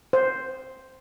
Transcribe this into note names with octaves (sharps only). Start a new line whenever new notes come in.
C5